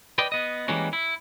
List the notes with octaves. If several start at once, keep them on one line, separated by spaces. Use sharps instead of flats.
B4 D5 D#5 G5
B3 D#5
E3 G3 G#3 A#3 C#4 F#4
E4